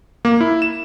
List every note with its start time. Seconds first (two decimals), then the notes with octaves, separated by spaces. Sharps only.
0.25 A#3
0.41 E4
0.62 E7